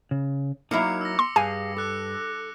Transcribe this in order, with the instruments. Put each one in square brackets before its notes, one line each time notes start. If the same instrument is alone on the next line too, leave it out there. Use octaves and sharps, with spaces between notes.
[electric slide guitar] C#3
[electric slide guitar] F#3 D#4 [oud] A#3 E4 E5 [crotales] D6 C#7 F7
[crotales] E6 A#6
[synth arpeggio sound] C6
[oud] G2 [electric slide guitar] G#4 F5 [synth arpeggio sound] G#5
[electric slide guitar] A4 [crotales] D6 F#6 C#7